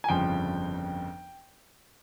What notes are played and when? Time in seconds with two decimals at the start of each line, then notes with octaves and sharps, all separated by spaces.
0.04 G#5
0.09 G1 F2 C#3 F3 G5